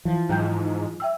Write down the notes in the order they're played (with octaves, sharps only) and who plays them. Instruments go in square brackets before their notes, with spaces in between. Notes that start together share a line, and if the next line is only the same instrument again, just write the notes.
[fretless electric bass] E3 F3
[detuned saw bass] G#2 [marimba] F#3 G5 G6
[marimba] E5 G5 E6